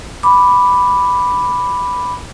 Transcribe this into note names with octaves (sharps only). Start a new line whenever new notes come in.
B5 D6